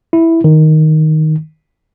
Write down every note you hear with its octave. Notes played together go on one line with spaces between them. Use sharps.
E4
D#3